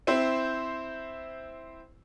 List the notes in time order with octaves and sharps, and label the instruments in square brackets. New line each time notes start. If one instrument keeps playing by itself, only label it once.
[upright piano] C4 E4 C5